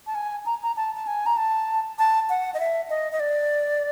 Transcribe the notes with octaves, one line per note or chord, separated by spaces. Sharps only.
A5
G#5
A#5
A#5
A5
A5
G#5
A#5
A5
A5
F#5
D#5
E5
D#5
D#5
D5